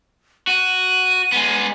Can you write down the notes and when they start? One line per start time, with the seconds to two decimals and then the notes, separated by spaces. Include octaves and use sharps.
0.47 F#4 D#7
1.32 G#3 B3